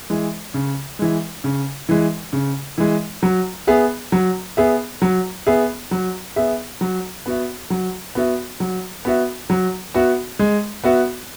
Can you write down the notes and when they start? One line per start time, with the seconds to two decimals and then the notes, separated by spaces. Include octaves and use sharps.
0.10 E3 G#3
0.54 C#3
0.99 E3 G#3
1.44 C#3
1.89 E3 G#3
2.33 C#3
2.78 E3 G#3
3.23 F#3
3.67 B3 G#4 E5
4.12 F#3
4.57 B3 G#4 E5
5.02 F#3
5.47 B3 G#4 E5
5.91 F#3
6.36 B3 G#4 E5
6.81 F#3
7.26 B3 F#4 E5
7.70 F#3
8.15 B3 F#4 E5
8.60 F#3
9.05 B3 F#4 E5
9.50 F#3
9.94 B3 F#4 E5
10.39 G#3
10.84 B3 F#4 E5